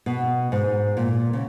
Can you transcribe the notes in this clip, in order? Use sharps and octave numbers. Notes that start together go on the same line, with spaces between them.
B2
G#2
A#2
C#3